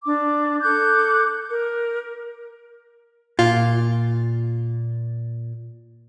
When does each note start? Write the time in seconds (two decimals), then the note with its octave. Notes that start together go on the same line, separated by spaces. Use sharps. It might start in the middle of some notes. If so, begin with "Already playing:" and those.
0.04 D4 D6
0.61 A4 D6 F#6 G6
1.48 A#4
3.39 A#2 F4